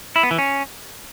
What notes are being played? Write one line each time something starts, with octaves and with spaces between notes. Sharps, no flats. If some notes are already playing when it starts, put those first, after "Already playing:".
E4
B3
E3
C#4